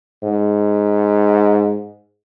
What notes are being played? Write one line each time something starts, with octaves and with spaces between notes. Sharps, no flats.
G#2